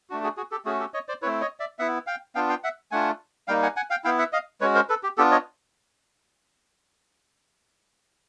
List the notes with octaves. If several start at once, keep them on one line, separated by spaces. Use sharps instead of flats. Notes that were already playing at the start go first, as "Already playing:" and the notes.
A3 D4 F#4
F#4 G#4
F#4 G#4
G4 A4
A3 C#4 F#4 G#4
G4 A4
C#5 D#5
C5 D5
A3 C4 E4 B4 C#5
C#5 D#5
D5 E5
B3 E4 E5 F#5
F5 G5
B3 D4 F4 F5 G5
F5 G5
E5 F#5
A3 D4 F4 F#5 G#5
G3 A#3 D#4 F5 G5
F#5 G#5
F#5 G#5
F5 G5
B3 E4 F5 G5
E5 F#5
D#5 F5
G#3 C#4 F#4 B4 C#5
A#4 C5
A4 B4
G4
B3 D4 F4 G4 A4
C#5 D#5